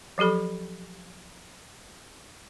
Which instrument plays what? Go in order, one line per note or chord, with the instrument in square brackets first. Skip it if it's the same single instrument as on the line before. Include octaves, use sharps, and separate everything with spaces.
[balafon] F3 F#3 G4 A4 B5